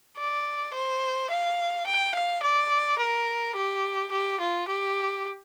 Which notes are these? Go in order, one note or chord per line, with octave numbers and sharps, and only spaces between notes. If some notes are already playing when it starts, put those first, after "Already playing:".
D5
C5
F5
G5
F5
D5
A#4
G4
G4
F4
G4